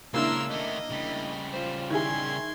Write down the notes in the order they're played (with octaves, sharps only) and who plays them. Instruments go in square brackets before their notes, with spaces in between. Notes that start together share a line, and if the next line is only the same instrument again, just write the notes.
[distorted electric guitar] C#2 A#4 [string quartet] C#3 C6 E6 [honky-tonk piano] A#3 D4 E4
[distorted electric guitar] D#3 A3 [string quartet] D#5
[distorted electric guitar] C#3 G3
[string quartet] F4 C5
[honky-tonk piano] D#3 E4 G#4 [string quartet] C6 G#6